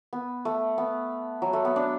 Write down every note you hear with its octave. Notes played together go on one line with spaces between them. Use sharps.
B3
A3
B3
F#3
A3
B3
D4